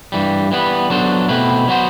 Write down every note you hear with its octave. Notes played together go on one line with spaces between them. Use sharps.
G2 E3 G3
E3 G3 B3 E4 B4
F#3 B3 D4 A4 C5
B2 A3 C4 E4 B4
F#3 B3 F#4 C5